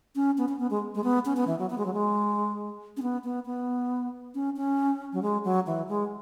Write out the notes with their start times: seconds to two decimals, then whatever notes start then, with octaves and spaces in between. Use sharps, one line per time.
0.16 C#4
0.38 B3
0.49 C#4
0.59 B3
0.71 G#3
0.95 G#3
1.04 B3
1.25 C#4
1.37 B3
1.48 E3
1.59 F#3
1.70 B3
1.78 G#3
1.86 F#3
1.94 G#3
2.97 C#4
3.02 B3
3.24 B3
3.46 B3
4.35 C#4
4.56 C#4
5.13 F#3
5.22 G#3
5.44 F#3
5.67 E3
5.89 G#3